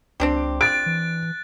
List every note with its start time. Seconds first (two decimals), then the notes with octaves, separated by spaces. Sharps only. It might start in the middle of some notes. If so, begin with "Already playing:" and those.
0.20 C#2 C4 D4 G4
0.61 F#6 A6 D7
0.86 E3